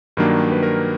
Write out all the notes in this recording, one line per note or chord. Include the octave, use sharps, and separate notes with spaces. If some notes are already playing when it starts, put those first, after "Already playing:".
G2 D#3 F#3 A#3 D4
B4
A#4